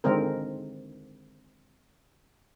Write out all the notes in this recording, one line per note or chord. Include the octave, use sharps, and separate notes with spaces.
D3 D#3 G#3 C4 A#4